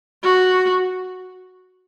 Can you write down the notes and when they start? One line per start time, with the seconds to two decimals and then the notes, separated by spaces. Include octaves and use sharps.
0.23 F#4